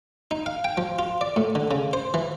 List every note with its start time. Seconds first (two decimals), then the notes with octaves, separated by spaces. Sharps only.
0.31 D#4
0.46 F5
0.64 G5
0.78 F3
0.99 F4
1.21 D5
1.36 A2
1.55 D3
1.71 C#3
1.93 C5
2.14 E3